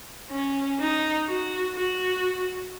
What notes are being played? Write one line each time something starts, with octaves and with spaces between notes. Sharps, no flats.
C#4
D#4
F#4
F#4